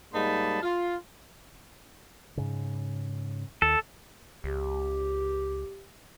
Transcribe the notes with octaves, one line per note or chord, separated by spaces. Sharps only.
G#2 G3 A#3 D#4 A5 B5
F4
G#2 C#3
D#2 A4
C#2 G4